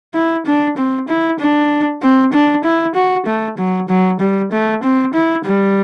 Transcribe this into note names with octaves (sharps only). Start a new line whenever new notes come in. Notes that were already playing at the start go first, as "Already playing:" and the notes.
E4
D4
C4
E4
D4
C4
D4
E4
F#4
A3
F#3
F#3
G3
A3
C4
E4
G3